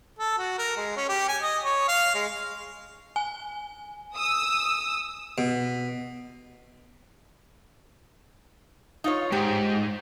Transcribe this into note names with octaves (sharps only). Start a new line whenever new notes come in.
A4
F#4
A#4
G#3
C#4
G4
G#5
D#5
C#5
F5
G#3
G#5
D#6 E6
B2
D#4 F4 C#5
G#2 G4